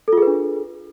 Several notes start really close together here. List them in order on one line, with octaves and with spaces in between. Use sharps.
A4 F4 G#4 B4 D4